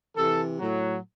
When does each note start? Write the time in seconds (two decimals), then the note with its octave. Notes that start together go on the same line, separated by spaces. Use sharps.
0.17 C3 E3 A4
0.60 A2 F#3